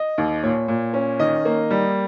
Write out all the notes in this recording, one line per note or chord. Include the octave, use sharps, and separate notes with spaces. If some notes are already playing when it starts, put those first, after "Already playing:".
Already playing: D#5
D#2
A#2 C#5
A#2
C#4
D#3 D#5
A#3
G3